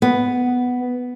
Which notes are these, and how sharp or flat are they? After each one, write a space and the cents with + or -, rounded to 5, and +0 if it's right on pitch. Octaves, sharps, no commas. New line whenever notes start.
B3 +5